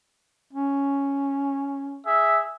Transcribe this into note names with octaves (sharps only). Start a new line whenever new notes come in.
C#4
G#4 E5